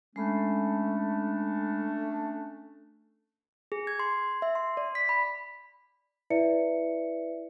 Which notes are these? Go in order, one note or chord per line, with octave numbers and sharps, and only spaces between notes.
G#3 A3 C#4 D4 B5
G#4
G#6
C6
E5
C6
D5
B6
B5
E4 B4 D5 E5 C#7